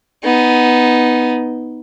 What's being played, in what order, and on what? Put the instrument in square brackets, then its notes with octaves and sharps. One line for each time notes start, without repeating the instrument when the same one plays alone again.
[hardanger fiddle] B3 D#4